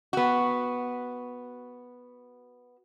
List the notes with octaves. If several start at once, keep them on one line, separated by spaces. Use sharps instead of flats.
B3 F#4